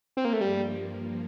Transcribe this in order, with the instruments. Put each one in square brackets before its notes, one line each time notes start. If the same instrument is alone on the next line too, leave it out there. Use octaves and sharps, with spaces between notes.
[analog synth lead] C4
A#3
A3
[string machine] G2 F3 A#3 [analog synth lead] G3